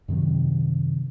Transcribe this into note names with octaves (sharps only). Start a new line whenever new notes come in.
F#2 C3 D#3 F#3